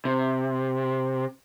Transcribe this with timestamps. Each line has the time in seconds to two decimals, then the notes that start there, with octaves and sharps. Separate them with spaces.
0.05 C3